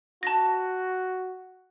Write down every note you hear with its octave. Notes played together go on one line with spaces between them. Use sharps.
F#4 A5 A#6